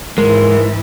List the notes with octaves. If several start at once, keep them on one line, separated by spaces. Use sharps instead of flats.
G#2 E3 G#3 A#4